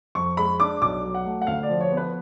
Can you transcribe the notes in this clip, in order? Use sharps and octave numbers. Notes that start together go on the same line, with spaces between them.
F2 C#6
G#3 B5
D4 D6
B1 D6
F#3
F#5
A3
F#5
D2 F5
D5
F3
C#5
B3
B4